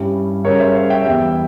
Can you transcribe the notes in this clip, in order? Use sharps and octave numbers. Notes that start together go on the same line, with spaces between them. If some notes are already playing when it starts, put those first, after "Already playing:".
Already playing: G2 G3 C#4 E4
C#3 G3 C#4 A#4 C#5
C5 E5
C#5 F5
E5 G5
E2 E3 G3 E5 G5